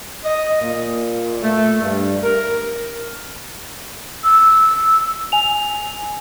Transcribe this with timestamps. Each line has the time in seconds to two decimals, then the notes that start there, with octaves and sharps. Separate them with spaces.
0.24 D#5
0.61 A#2
1.43 A3
1.82 G2
2.23 A#4
4.24 E6
5.32 G#5 F7